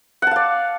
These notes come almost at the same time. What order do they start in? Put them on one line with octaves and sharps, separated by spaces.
F#5 A5 F5 D5